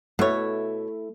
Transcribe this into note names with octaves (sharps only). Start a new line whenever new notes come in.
B2 A3 E4 C#5